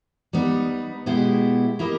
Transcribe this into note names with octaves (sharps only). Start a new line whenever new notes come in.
G3 B3 D#4
B2 G#3 B3 E4 G4
A#3 E4 G4 A#4 D#5